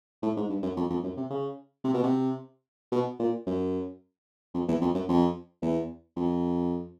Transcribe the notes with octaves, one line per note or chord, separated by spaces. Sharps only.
A2
G#2
G2
F#2
F2
F2
F#2
C3
C#3
C3
B2
C3
B2
A#2
F#2
F2
E2
F2
F#2
F2
E2
F2